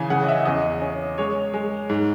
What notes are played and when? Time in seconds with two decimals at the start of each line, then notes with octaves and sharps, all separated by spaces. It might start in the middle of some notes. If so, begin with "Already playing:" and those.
Already playing: C#3 E3 G#5
0.10 C#3 F#5
0.24 D#5
0.28 E5
0.45 E2 D#5
0.82 C#4
1.18 G#3 C#5
1.54 G#3
1.89 G#2